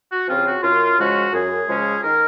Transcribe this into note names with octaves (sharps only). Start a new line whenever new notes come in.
F#4
C#3 F3 C4 F4
G#4
F#4
F#2 F4
C#3 F3 G#3 C#4 F#4
F#2 G#4
C#3 F3 G#3 C#4
D#3 A#4